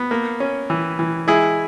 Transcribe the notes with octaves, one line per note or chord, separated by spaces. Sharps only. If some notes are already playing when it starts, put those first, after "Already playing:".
Already playing: B3
A#3
C#4
E3
E3
G#3 E4 G#4